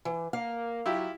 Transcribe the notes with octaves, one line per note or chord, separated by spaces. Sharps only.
E3
A#3 F5
F#3 E4 F4 G4